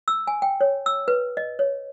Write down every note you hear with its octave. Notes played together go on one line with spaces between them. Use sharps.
E6
G#5
G5
C#5
E6
B4
D#5
C#5